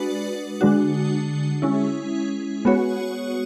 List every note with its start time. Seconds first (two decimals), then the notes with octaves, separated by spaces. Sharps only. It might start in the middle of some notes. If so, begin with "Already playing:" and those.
Already playing: G#3 D4 F#4 B4 D5
0.61 D3 G#3 D4 F#4
1.62 G#3 C#4 E4
2.65 G#3 B3 F#4 C#5